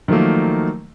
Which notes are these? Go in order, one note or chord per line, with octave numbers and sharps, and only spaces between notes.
D#3 F3 F#3 A3 A#3